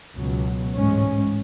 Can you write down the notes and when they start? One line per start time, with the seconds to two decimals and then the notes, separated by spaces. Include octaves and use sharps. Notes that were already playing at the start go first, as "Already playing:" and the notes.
0.16 C#2 B2 F#3
0.75 A1 G#2 G#3 C#4